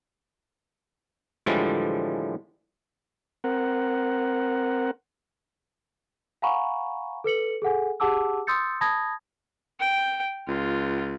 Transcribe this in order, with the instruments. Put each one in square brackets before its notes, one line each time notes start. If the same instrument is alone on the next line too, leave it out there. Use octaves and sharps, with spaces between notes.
[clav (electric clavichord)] A2 D3 E3 F3 G3 G#3
[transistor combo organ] C4 A#4 F#5
[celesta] F5 F#5 G#5 A#5 B5 C#6
A4 B4 C#7 F#7
G#4 A4 F#5 G#5
G4 G#4 F#5 A5 D6 E6
C6 D#6 E6 G6 A6 C#7
A5 B5 D#6 G#6 A#6
[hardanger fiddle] G5
[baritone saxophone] C#2 [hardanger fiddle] F4